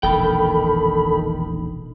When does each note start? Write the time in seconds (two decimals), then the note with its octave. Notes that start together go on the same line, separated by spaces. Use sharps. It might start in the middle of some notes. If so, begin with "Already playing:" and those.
0.03 E1 A#1 D#3 A4 G5 B5